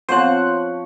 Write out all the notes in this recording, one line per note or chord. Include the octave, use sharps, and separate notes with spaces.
F3 B3 C4 C5 C#5 F#6